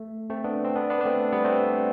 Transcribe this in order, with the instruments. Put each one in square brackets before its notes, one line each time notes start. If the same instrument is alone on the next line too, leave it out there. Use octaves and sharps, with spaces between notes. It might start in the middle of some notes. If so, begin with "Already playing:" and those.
Already playing: [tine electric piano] A3
A3 C4
B3 D4
C4
B3 D4
B3 D4
D4
A3 C4
G3 B3
A3 C4